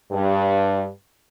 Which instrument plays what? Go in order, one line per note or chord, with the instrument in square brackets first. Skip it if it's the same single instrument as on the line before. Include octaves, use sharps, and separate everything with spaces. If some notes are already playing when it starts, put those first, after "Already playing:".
[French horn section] G2